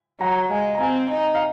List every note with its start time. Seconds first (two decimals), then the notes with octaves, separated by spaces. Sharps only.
0.20 F#3 F#5 A#5
0.51 G#3 F5 G#5
0.75 A#5
0.80 C4 F5 G#5
1.10 D#4
1.35 F5